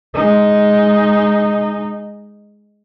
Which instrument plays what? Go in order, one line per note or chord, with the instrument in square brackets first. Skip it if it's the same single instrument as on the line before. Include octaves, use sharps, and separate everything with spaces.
[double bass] G#3 D#4